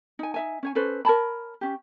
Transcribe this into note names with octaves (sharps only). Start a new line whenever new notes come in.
D#4 G#5
D#4 E5 G#5
C#4 C#5 G#5
C#4 A4 B4 C5
A#4 C#5 A5 B5
C#4 G4